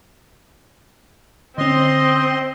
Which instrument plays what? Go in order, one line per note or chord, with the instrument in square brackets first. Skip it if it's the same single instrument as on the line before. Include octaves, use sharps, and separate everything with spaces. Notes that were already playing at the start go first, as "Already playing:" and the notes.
[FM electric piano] D3 C#4 [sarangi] C4 [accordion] D#5 C6